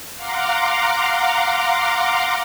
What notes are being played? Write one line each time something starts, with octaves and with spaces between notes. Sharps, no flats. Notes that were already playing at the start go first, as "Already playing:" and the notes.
F5 F#5 A#5 C6 D6